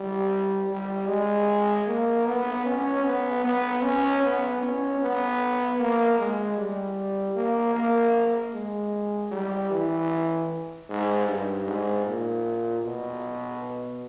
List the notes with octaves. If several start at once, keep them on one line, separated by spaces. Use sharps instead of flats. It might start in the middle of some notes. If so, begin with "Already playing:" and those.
Already playing: G3
G3
G#3
A#3
B3
C#4
B3
B3
C#4
B3
C#4
B3
A#3
G#3
G3
A#3
A#3
G#3
G3
E3
G#2
G2
G#2
A#2
B2